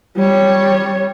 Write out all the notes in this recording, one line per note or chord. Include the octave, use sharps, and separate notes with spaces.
G3 C#5